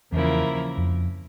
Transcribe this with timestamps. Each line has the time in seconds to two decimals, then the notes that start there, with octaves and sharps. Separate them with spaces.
0.12 E2 C#3 F3 A#3 E4 A#4
0.77 F2